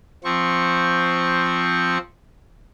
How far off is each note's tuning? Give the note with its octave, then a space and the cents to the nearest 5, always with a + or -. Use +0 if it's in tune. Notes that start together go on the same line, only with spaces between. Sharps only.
F3 +0 C4 +0 C#6 -10